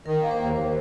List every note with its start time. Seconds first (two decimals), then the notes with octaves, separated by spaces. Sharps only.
0.06 D#3 A#4
0.22 A#3
0.31 C5
0.40 D#2
0.56 D#2 C5